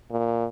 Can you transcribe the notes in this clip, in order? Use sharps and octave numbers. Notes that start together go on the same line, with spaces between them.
A#2